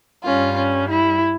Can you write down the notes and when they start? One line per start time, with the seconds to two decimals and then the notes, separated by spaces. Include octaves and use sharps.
0.24 G2 G3 C#4 F4
0.56 C#4
0.88 E4